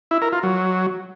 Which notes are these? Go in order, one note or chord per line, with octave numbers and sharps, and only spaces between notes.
E4
A#4
F4
F#3